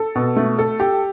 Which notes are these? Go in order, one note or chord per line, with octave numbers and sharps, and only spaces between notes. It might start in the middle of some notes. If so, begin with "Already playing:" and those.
Already playing: A4
B2
A3
A4
G4